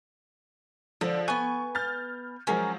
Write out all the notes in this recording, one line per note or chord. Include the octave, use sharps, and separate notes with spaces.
D3 F3
B3 G#5 C#6
F6 G6 A6
F3 F#3 G#3 C#4 A#4 F5